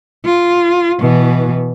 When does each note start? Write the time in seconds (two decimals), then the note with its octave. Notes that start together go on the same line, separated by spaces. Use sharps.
0.25 F4
1.00 B2 E3